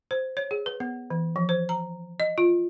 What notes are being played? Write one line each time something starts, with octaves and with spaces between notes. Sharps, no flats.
C5
C#5
G#4
B4
B3
E3
F3
C5
A#5
D#5
F4